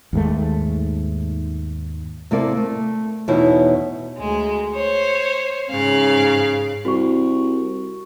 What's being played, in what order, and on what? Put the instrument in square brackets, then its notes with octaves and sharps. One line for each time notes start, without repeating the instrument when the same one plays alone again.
[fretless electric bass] D#2 G#2 A3
[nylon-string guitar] C3 A#3 E4 A4 D5
A3
E2 B2 D#4 E4 C#5
[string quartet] D2 G#3
C5 C#5
G#2 C#3 F5 F#6
[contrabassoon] C2 [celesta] F#4 C#6